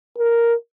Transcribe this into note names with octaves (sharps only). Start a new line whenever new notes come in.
A#4